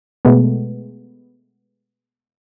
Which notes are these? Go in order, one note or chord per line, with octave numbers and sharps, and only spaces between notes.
B2 G#3 A3 B3